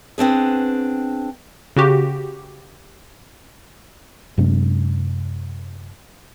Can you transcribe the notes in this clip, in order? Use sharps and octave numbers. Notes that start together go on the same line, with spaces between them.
B3 C4 D4 G#4
C#3 F#4 G4
F#2 C3 G#3 D4